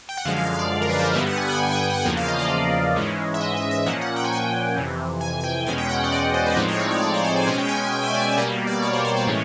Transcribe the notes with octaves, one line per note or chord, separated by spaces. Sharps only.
G5
F#5
F#2 D3 F3 G#3 F5
F5
F5
D5
A#4
B4
A#4
C5
B4
G2 D3 G3 B3 E5
F#5
G#5
G5
G5
F#5
F#5
G#5
G5
E2 C#3 F3 A#3 F#5
F5
D#5
D5
G#2 E3 G#3 C#4
E5
D#5
E5
E5
A#2 F3 A#3 C#4 F#5
F#5
G5
G#5
G5
F2 C3 E3
G#5
G#5
G5
E2 B2 G#3 C#4 G#5
G5
F#5
D5
D#5
C5
B4
A2 F3 G#3 C4 D#4 C5
C#5
D5
D5
C#5
C5
D5
G#5
B2 G#3 C#4 G#5
G5
G#5
G5
G#5
E5
D5
D5
B2 G3 A#3 D5
D5
C#5
C5
D5
C#5
A2 E3 G#3 C#4